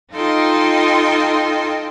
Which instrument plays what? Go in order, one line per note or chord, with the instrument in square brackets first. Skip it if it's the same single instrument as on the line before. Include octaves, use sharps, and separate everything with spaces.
[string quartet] D#4 F4 A4 D#5 G5 C6